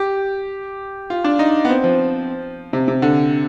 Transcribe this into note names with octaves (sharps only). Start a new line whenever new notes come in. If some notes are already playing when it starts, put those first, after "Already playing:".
Already playing: G4
F4
D4
D#4
B3
C4
F3
C3
C3
D3